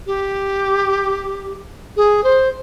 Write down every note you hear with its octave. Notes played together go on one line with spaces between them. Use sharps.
G4
G#4
C5